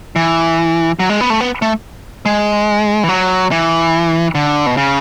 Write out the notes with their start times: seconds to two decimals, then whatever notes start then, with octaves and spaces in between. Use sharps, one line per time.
0.16 E3
1.00 F#3
1.09 G#3
1.21 B3
1.30 A3
1.41 B3
1.62 A3
2.26 G#3
3.04 E3
3.09 F#3
3.51 E3
4.35 D3
4.66 B2
4.77 C#3